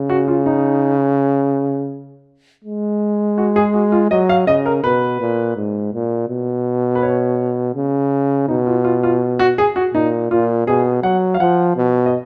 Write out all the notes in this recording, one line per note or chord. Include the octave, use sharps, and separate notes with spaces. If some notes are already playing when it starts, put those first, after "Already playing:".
Already playing: C#3
F#4
F4
D#4
G#3
F#4
G#4
F#4
F4
F#3 D#5
F5
C#3 D#5
A#4
B2 B4
A#2
G#2
A#2
B2
B4
C#5
C#3
B2 D#4
F4
F4
F4
F#4
G#4
F#4
A#2 D#4
A#2 F4
B2 G#4
F#3 F#5
F5
F3 F#5
B2
D#5